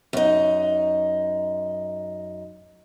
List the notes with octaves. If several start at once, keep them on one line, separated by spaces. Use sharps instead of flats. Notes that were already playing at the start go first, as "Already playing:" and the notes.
F#2 D#4